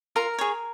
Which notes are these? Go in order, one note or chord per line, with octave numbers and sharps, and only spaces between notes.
F4 A#4 A#5
G#4 C#5